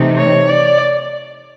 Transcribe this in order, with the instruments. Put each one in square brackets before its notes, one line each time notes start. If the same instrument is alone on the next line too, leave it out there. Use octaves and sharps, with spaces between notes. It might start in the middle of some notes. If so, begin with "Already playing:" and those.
Already playing: [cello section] C3 E3 A3 C4 D#4
[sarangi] C#5
D5